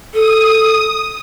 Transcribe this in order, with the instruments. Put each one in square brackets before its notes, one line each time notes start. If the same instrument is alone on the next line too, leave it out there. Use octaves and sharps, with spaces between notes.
[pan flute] A4 [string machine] D#6